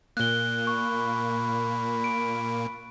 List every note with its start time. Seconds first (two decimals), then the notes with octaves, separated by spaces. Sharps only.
0.17 A#2 A#3 F#6 G7
0.67 B5 C#6
2.04 D7